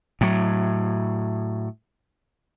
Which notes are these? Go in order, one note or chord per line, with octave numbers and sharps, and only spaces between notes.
A2 F#3